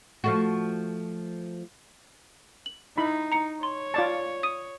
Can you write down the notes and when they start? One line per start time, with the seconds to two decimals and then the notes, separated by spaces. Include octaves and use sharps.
0.24 F3 A3 F#4
2.66 F#7
2.98 D#4 E4 B5
3.32 A#5 C#7
3.63 C#5 C6
3.94 F4 D5 A5
4.43 D#6 D#7